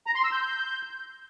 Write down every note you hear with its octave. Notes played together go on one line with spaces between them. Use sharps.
A#5
C6
E6
G6